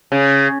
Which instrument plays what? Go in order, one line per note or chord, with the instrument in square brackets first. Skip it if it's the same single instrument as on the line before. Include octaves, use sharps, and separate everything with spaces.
[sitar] C#3